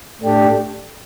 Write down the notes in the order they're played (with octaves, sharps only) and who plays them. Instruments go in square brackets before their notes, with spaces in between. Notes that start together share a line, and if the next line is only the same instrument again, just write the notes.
[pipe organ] A2 A3 D4 G4